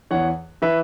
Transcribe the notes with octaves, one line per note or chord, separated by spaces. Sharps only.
E2 E3 C#5 F#5
E3 B4 E5